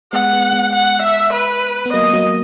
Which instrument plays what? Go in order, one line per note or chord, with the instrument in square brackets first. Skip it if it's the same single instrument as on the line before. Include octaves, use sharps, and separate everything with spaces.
[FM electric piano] G#3 B3 [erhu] F#5
[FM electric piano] G#3 B3
G#3 B3
[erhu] F#5
E5
B4
[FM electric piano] B3
[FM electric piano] F#3 A#3 [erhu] D#5
[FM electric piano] F#3 A#3